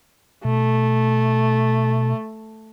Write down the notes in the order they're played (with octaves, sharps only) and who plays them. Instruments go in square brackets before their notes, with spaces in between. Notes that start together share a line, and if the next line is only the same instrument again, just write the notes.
[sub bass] B2 [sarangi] A3